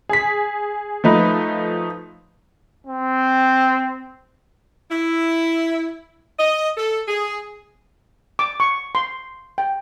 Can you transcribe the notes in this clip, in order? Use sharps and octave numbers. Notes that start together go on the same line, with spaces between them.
G#4 B6
F3 A3 D#4 B4
C4
E4
D#5
A4
G#4
D6
C#6
C6
G5